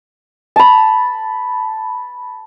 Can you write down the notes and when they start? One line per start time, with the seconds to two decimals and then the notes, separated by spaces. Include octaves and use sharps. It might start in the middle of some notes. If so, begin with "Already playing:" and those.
0.56 A5 B5